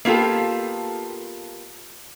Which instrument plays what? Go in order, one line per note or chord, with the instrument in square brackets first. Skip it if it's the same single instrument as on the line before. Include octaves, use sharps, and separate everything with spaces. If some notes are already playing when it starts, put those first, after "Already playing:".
[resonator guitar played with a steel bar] A#3 B3 F4 G4 A4